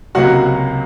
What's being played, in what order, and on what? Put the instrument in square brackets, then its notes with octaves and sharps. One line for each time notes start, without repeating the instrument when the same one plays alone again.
[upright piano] C#2 C3 F#3 A#3 F#4 F#5